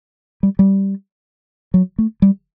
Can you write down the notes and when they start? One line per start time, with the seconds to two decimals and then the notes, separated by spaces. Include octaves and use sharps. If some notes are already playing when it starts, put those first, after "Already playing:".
0.43 G3
0.59 G3
1.74 F#3
1.98 A3
2.22 G3